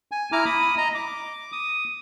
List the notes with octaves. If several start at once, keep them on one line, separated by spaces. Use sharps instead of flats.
G#5
E4 A#5 D6 F6
B5 D#6
D#5 A#5
D6
D#6